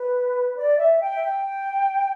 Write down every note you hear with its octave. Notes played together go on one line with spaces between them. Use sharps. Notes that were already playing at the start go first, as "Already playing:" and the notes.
Already playing: B4
D5
E5
G5
E5
G5